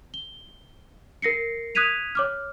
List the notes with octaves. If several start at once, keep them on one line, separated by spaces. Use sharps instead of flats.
G7
A#4 A#6 C7 C#7
D#6 F#6 G#6 B6 D#7 F7
C#5 D6 F6